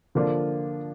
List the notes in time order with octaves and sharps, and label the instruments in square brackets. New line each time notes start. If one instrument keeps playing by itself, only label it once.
[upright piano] D3 F3 A#3 D4 F4